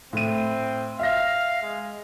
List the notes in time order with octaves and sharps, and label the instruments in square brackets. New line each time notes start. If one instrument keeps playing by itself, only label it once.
[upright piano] A2 D#7 [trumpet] C4
[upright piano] E5 A#6 [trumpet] F5
[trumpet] G#3